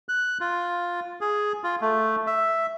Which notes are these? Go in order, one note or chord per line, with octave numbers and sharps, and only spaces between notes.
F#6
F4
G#4
F4
A3
E5